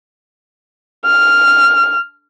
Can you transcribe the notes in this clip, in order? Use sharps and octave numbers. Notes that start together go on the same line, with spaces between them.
F6